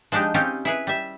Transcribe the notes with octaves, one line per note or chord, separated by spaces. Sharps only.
F3 G#3 D4 D#4 G4
C4 C#4 D#4 F4 G4
E4 G#4 B4
G3 E5